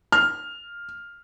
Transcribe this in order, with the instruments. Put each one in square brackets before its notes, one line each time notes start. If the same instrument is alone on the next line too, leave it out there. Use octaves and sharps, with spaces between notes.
[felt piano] F6